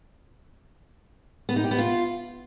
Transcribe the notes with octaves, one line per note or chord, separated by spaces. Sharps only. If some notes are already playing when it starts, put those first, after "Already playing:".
B3
D#4
G4
B3
F4